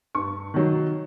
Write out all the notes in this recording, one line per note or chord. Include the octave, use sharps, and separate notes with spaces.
G2 C#6
D#3 F#3